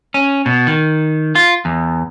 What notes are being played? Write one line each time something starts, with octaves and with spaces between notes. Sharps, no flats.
C#4
B2
D#3
F4
E2